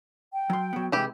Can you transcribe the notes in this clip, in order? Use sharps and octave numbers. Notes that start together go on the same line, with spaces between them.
G5
F#3 C6
F#3 B3
C3 E3 G#3 G4